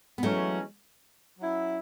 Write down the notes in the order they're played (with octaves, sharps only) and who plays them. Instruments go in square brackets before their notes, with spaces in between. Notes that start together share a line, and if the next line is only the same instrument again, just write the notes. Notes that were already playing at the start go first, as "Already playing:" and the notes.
[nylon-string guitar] B3
[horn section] E3 G#3 C#4 [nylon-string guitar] F#3 A3
[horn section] F#3 C#4 E4